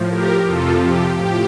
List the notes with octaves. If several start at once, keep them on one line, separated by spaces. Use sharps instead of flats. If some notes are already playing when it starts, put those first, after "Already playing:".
Already playing: A2 F3
G4 A#4
F2 C3 F3 F4 A4
G4
A2 F3 G4